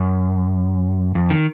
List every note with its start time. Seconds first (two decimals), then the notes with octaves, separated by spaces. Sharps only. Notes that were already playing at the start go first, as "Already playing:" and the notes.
Already playing: F#2
1.15 F2
1.30 D#3